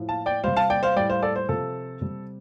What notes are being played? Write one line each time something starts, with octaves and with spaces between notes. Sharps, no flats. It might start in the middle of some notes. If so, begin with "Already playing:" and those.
Already playing: A2 F3
F5 A5
D5 G5
C3 G3 C5 F5
F5 A5
D5 G5
C5 F5
A2 G3 D5 G5
C5 F5
A4 D5
C5
C3 F3 A4
C3 G3